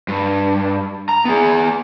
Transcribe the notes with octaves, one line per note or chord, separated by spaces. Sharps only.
G2
A#5
B3 G#4